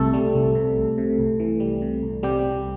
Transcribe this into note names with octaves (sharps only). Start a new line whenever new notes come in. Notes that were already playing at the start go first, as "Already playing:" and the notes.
Already playing: C2 C3 A3 A4
G3
C2
C3
C2
C3
C2
E3
G3
C3
C2
C3 G3 G4
C2